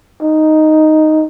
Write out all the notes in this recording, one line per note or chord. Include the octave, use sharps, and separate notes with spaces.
D#4